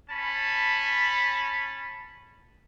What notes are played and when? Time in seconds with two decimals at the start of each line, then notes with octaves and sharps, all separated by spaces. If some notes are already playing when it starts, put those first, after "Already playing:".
0.10 C#4 A5 B5